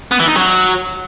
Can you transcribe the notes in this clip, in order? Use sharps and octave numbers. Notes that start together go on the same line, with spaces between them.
B3
E3
D#4
F#3